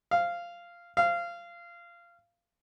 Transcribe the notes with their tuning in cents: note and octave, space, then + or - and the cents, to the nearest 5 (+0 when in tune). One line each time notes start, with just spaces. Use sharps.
F5 -10
F5 -20